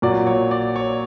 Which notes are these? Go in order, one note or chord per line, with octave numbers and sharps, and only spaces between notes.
A#2 F#3 D5
C#5
D5
C#5